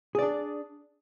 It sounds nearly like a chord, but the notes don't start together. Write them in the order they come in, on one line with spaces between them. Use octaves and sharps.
G#4 D5 D4